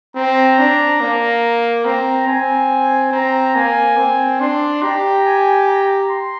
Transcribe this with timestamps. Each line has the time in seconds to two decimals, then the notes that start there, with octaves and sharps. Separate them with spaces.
0.16 C4 A#5
0.59 D4
1.01 A#3
1.85 C4 A#5
2.27 C4 G#5
3.12 C4 A#5
3.55 A#3 G#5
3.97 C4
4.40 D4 C6
4.83 G4 A#5
5.25 G#5
5.67 A#5
6.09 C6